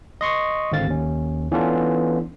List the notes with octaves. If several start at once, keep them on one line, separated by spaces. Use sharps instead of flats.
D#5 C6 C#6 D#6
G#1 D3 C4 F5 A6
D#2 C#4
E3 B3 C#4 D4 F4 A4